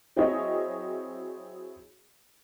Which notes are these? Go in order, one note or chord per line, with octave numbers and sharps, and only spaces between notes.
F#3 C4 E4 G#4 C#5 D#5